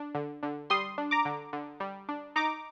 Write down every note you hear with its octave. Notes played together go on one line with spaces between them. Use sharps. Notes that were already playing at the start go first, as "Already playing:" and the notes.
Already playing: D4
D3
D3
G3 C6 D#6
D4
A#5 D6
D3
D3
G3
D4
D#4 A#5 D6